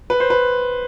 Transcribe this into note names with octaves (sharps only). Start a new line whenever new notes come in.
B4
C5
B4